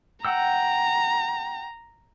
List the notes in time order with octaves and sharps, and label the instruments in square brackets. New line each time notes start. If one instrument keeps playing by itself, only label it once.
[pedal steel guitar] F#5 G5 E6 [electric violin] A#5